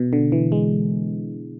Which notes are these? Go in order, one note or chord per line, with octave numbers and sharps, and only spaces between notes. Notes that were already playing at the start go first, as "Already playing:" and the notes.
Already playing: B2
D3
E3
G#3